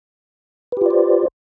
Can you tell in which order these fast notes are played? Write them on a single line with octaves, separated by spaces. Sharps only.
B4 G4 F4 D5 C5